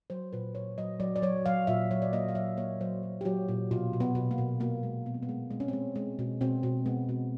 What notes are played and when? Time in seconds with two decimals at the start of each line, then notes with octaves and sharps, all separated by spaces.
0.10 F#3 C5
0.33 A#2 B4
0.55 A#2 C#5
0.78 F#3 D#5
1.00 F#3 D5
1.16 D5
1.22 F#3 C#5
1.46 F#3 F5
1.67 A#2 E5
1.91 F#3 C#5
2.02 D5
2.13 A#3 D#5
2.29 F5
2.35 F#3 E5
2.57 A#3 C#5
2.81 F#3 C5
3.03 F#3
3.21 G4
3.25 F#3 F#4
3.49 A#2
3.71 B2 F4
3.93 B2
4.00 B3
4.15 B2
4.31 A#3
4.38 B2
4.60 B2 A#3
4.83 G#3
5.06 B2 B3
5.14 C4
5.23 B3
5.29 G#3
5.51 G#3 C4
5.60 C#4
5.68 G#3 C4
5.96 G#3
6.19 B2
6.41 B2 C4
6.63 B2
6.86 G#3 B3
7.09 B2